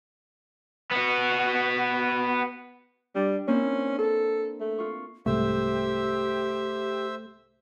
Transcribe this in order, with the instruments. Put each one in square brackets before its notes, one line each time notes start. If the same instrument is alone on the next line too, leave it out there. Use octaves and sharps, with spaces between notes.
[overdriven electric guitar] B3 F#4
[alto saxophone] G3 [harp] D4
[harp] A#3 C4 E4 [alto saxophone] C#4
[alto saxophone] A4
A3
[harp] F4 C#6
[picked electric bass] C2 G#2 [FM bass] A3 [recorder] G4 [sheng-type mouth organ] C5 E5 E6